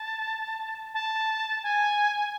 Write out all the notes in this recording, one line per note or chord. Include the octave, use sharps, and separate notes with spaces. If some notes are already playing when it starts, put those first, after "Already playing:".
Already playing: A5
A5
G#5